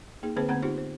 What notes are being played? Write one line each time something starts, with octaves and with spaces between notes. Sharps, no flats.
A#3 D#4 G#4
D3 A#3 C4 G#4 B4 C5
D3 A3 B3 C4 F#5 A#5
D#4 F4 G4 C5
C5